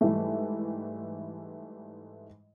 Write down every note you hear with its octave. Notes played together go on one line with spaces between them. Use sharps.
G#2 E3 G3 A3